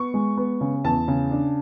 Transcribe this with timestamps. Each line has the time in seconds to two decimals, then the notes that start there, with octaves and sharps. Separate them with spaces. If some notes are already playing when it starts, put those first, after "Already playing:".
Already playing: B3 C#6
0.14 G#3
0.37 B3
0.61 C#3
0.84 E2 A5
1.08 C#3
1.31 D4